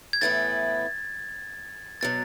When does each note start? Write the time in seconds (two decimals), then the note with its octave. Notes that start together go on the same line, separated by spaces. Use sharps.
0.13 G#6
0.21 A2 E3 B3 E4 A6
2.01 B2 F#3 A6